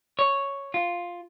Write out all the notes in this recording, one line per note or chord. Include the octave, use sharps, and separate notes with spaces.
C#5
F4